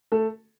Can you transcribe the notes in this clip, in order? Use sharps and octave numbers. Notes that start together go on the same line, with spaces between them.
A3 A4